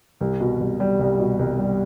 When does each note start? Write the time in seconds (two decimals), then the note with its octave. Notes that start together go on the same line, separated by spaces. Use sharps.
0.21 C2
0.40 B2
0.60 C2
0.80 G3
0.99 C2
1.19 B2
1.39 C2
1.59 G3